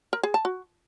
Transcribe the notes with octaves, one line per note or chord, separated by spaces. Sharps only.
A#4
G#4
A5
F#4